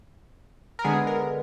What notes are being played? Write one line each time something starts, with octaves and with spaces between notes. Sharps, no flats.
A#4
D3 G#3 B3 G#4
A#4